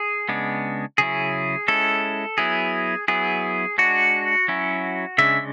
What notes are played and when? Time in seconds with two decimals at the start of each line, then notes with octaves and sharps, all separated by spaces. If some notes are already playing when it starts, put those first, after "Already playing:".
Already playing: G#4
0.29 C#3 G#3 B3 D4
0.98 C#3 F#3 C#4 E4 G#4
1.68 G#3 C#4 E4 A4
2.38 F#3 B3 E4 G#4
3.08 F#3 B3 E4 G#4
3.78 G#3 D4 F#4
4.48 F#3 C#4 E4
5.18 C#3 G#3 D4 E5